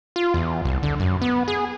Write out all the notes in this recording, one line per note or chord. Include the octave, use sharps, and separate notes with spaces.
F4
E2
C2
D3
F#2
B3
G#4